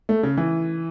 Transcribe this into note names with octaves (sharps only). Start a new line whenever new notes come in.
A3
C#3
E3